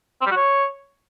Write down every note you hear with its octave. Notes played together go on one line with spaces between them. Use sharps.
C4
G3
F#4
C#5